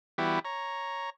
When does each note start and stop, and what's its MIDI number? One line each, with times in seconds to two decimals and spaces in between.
0.18 0.39 52
0.18 0.39 55
0.18 0.39 59
0.18 0.39 64
0.18 0.39 66
0.18 0.39 67
0.45 1.10 73
0.45 1.10 82